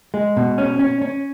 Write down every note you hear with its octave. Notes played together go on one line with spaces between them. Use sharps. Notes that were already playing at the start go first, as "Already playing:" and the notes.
G#3
B2
C#4
C#4
C#4